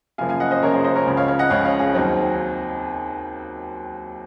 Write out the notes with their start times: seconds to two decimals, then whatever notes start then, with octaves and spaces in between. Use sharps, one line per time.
0.18 F#2 C#3 F3 A#3 F5 G#5
0.29 F5 G#5
0.40 D#5 F#5
0.51 C5 D#5
0.62 F#2 C#3 F3 A#3 A#4 C#5
0.74 G#4 C5
0.84 C5 D#5
0.95 A#4 C#5
1.06 C#2 C#3 F3
1.17 C#5 F5
1.28 C#5 F5
1.39 D#5 F#5
1.50 C#2 C#3 F3 C#5 F5
1.65 C#5 F5
1.79 G#4
1.94 D#2 D#3 F#3 C4